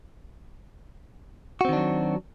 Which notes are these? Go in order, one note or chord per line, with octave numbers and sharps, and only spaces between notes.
D#3 F#3 C4 D4 F#4